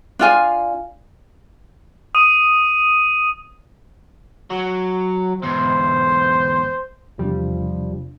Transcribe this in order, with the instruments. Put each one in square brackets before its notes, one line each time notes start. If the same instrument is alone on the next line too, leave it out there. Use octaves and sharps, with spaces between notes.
[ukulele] D4 F4 G#5
[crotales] D#6 D#7
[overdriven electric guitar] F#3
[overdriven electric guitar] E2 G#2 [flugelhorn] C5
[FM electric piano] E2 [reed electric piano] C3 D4 [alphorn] F3 [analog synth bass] G3